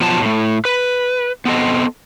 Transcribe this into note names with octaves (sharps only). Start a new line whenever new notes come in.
B2 F3 F#3 A5
A2 A3
B4
B3 C4 A4 D#5